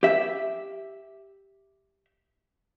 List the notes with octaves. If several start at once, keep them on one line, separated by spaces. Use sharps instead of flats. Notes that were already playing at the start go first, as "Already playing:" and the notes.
G4 E5